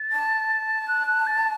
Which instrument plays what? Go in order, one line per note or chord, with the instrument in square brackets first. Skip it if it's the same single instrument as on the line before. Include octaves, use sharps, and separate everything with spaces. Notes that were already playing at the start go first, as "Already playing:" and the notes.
Already playing: [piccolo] A6
[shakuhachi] A5
[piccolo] F#6
F#6
A6